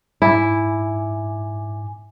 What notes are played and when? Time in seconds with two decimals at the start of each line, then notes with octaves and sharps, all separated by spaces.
0.22 G#2 E4 G#5 D6